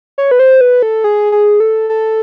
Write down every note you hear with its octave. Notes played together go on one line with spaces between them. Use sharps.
C#5
B4
C5
B4
A4
G#4
G#4
A4
A4